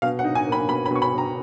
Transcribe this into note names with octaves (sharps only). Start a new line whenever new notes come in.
B2 F5
F#5
D#4
G#5
A#3 B5
B2 B5
B5
B2 C#6
B5
B2
A#5